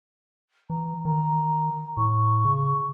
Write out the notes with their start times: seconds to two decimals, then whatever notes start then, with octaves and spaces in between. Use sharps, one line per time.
0.70 E3 A#5
1.05 D#3 A#5
1.97 A2 C#6
2.45 C#3